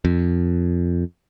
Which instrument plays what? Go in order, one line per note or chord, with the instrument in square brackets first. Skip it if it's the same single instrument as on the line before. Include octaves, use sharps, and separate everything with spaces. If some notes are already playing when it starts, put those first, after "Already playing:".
[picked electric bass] F2